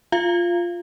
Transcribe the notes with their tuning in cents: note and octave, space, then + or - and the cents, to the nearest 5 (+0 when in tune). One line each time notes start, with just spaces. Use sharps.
F4 +0 F5 -25